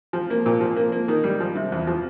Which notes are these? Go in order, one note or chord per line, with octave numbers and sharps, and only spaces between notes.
F3
A#3
A#2
F3
A#3
A#3
D#3
G3
F3
C3
E2
F3